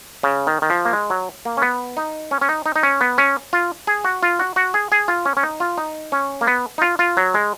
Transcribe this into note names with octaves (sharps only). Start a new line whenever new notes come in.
C#3
D#3
D#3
F3
A#3
G#3
F#3
A#3
C#4
B3
D#4
C#4
C#4
D#4
D#4
D#4
C#4
B3
C#4
F4
G#4
F#4
F4
F#4
F#4
G#4
G#4
F4
C#4
C#4
D#4
F4
D#4
C#4
A#3
B3
D#4
F4
F4
F#3
G#3